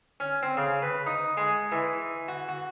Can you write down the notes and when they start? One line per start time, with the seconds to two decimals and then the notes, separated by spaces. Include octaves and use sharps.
0.20 C#4
0.43 C4
0.57 C#3
0.82 B4
1.07 D#4
1.37 G#3
1.72 E3
2.28 F#4
2.49 F#4